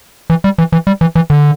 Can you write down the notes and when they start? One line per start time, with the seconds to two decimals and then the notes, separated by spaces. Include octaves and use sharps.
0.30 E3
0.44 G3
0.58 E3
0.72 E3
0.87 G3
1.01 E3
1.15 E3
1.30 D3